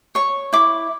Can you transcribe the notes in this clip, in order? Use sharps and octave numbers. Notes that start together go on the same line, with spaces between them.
C#5 C#6
E4 D6